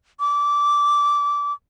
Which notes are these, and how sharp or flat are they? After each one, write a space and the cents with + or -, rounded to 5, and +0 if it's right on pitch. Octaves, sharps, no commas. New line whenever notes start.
D6 -15